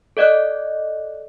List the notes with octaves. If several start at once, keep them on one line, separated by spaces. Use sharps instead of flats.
A4 D5 D#5 D6 F#6